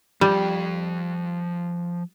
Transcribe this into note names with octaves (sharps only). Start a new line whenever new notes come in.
F3 G3 G5